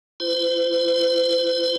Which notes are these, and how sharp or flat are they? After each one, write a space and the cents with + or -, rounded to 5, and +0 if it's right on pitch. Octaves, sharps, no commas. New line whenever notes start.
E4 +45 C5 -35